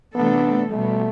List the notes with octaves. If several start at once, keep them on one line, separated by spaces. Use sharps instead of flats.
C3 E3 A3 B3 D4 A4
B2 G3 A3 B3